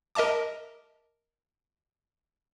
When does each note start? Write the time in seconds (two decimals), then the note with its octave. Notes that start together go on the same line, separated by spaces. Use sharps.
0.15 A#4 D#5 E5 A5 D6